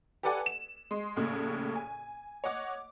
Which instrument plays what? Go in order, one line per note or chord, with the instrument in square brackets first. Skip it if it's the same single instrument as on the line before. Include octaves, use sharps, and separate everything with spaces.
[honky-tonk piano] G4 A4 B4 D5 F#5 G#5
E7
G#3 C6
A#1 D#2 A2 C#3
G#5
C#5 D#5 F#5 D6